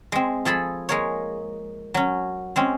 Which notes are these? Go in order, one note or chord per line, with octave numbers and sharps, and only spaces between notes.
G#3 C4
F3 G#4 A4 B5
G#3 A#3 C#5
F#3 C#4
G#3 C4 C#4